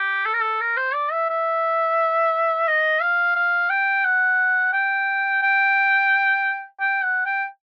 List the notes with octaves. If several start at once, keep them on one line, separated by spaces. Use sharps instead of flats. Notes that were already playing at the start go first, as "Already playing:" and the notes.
Already playing: G4
A4
A#4
A4
A#4
C5
D5
E5
E5
D#5
F5
F5
G5
F#5
G5
G5
G5
F#5
G5